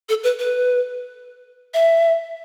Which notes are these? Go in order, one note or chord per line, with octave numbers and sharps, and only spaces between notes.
A4
B4
B4
E5